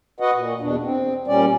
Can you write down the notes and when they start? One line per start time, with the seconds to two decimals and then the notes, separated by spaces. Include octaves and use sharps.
0.20 F#4 B4 D#5 F#5
0.33 A#2
0.61 E2 B2 D4
0.83 C4
1.28 A#2 G3 C#4 D5